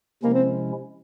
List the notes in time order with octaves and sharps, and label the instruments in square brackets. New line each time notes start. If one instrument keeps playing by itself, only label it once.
[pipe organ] C3 F3 G#3 C#4 E4 [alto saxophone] A#3
[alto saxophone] C4